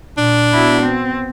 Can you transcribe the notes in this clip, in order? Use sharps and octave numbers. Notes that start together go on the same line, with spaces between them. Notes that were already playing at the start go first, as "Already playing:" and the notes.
A#2 D4
B3 E4 F#4
C4